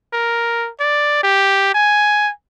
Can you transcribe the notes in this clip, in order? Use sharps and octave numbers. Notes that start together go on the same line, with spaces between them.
A#4
D5
G4
G#5